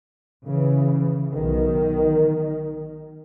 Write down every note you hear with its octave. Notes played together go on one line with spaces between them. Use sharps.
C#3 E3
B1 B2 D#3